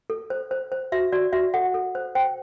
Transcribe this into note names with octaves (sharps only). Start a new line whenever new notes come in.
A4
C5
C5
C5
F#4 E5
F#4 D5
F#4 E5
A4 F#5
A4
C5
C5 G5